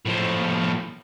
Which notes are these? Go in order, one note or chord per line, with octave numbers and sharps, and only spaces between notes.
A2 F3